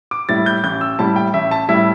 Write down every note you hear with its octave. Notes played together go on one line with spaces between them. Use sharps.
D6
A2 G3 E4 A6
G6
A1 G6
E6
A2 G3 E4 A5
G5
A1 E5
A5
A2 G3 E4 E5